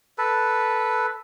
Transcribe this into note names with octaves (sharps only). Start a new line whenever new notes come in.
A4 B4